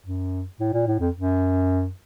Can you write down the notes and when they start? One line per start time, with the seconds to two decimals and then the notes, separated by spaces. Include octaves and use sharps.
0.06 F#2
0.60 A2
0.73 A#2
0.87 A2
1.00 F2
1.14 F#2